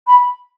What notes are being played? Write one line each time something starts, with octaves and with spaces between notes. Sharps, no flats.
B5